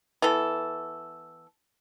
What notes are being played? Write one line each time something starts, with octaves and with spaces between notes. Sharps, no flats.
E3 B3 A4